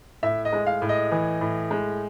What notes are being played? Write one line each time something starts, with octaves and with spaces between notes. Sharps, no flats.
A2 E5
D#5
G#3
F5
A2
D#5
E3
A2
G#3